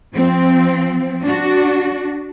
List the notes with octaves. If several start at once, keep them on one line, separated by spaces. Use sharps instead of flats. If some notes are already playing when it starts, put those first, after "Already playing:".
F3 C4
D4 F#4